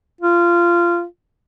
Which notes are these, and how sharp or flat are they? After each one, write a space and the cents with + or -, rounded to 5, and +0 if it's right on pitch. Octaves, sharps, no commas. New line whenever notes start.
F4 -20